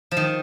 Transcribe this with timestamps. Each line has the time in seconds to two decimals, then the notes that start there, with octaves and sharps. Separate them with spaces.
0.11 F3
0.17 D#3